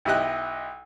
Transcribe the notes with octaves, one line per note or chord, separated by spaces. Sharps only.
B1 E4 G4 D#5 F#6